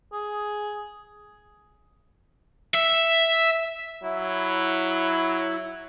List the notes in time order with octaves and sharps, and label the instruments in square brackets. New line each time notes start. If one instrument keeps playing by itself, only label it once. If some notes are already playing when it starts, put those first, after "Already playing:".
[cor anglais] G#4
[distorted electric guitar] E5
[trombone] F#3 [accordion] E4